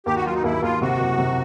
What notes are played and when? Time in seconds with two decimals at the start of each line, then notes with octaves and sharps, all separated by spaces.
0.06 D#2 G4
0.16 F#4
0.25 F#3 F4
0.34 D#4
0.44 D#2 E4
0.62 D#2 F4
0.81 C3 F#4
1.00 F#1
1.18 C3